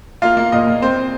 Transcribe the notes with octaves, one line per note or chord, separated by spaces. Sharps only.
A#3 F4 F5
A#3
A#2 D#5
A#2
C4 C5
C4